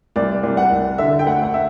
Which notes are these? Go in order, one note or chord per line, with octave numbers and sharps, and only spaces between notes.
C2 D5
C2
F#5
C2
D3 E5
G5
D2 F#5
F#5
E5